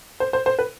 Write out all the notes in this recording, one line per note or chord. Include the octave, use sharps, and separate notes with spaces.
C5
C5
C5
B4